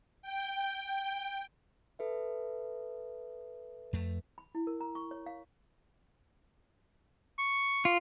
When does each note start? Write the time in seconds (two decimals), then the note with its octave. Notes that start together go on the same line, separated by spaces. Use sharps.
0.22 G5
1.99 A4 B4 E5
3.93 F2 A3
4.38 B5
4.55 E4
4.67 A#4
4.81 A#5
4.95 C#6
5.11 C#5
5.26 F5
7.38 C#6
7.85 F4